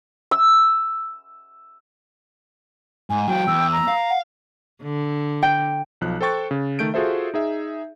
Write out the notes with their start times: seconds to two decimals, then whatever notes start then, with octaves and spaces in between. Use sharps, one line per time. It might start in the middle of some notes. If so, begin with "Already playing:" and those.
0.31 E6
3.10 G#2 G#5
3.28 F#3 F4 G5
3.47 E2 E6
3.72 A#5
3.88 F5
4.10 F#5
4.82 D3
5.43 G5
6.01 B1 F3 F#6
6.21 A4 C5 G5 C#6 A6
6.51 C#3
6.79 D#3 A3 G6 D7
6.94 F4 F#4 G#4 A4 C5 E5
7.34 D#4 G#4 E5